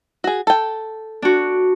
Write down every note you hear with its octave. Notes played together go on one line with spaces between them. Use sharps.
F#4 G#4
A4 G5
D4 F#4